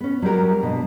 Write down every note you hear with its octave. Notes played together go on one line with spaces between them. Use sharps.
B3 C#4
F#3 G3 G4 A#4
G2 B2 B3